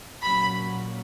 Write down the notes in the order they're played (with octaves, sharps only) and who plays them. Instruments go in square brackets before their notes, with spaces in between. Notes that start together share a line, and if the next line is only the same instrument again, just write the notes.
[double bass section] A#2 F#3 A#3 C#4 [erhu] B5